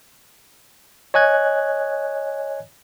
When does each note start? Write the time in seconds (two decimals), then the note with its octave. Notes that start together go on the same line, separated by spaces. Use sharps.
1.14 C#5 D#5 G#5 F#6 G#6